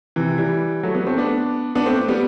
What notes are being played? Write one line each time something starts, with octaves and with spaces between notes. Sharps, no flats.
C3 E3
E3 G3
F#3 A3
G3 B3
A3 C4
B3 D4
B3 D4
A3 C4
G3 B3